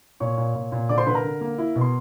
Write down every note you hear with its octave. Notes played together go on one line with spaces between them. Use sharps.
A#2 C#5 C#6
A#2
A#2
A#2
D3 D5 D6
C5 C6
D3 B4 B5
A#4 A#5
D3
A#3
E4
B2
C6